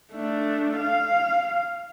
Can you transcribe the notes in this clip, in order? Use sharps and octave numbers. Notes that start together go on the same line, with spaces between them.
A3 D4
F5